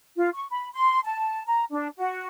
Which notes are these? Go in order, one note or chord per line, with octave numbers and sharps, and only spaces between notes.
F4
C#6
B5
C6
A5
A#5
D4
F#4